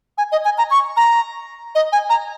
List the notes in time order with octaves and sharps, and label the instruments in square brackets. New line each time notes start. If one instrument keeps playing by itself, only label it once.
[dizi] G#5
D#5
G#5
A#5
C#6
A#5
D#5
G#5
A#5